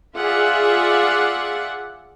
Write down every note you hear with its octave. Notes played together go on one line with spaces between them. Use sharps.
F4 G#4 D5 E5 F#5